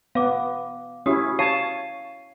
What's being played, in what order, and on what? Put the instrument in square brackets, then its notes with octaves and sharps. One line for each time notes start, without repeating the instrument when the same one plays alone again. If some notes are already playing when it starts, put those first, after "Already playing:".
[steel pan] B3 [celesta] F5 D6
[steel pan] C#4 E4 [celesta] F#4 G4 D#6
[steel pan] C#5 A5 [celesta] F5 C7 D#7